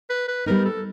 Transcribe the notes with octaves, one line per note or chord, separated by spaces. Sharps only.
B4
B4
G3 B3 D#4 A#4
A4